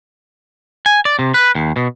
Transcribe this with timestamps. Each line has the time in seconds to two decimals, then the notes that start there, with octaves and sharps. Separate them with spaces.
0.86 G#5
1.05 D5
1.19 C3
1.34 B4
1.55 D#2
1.76 B2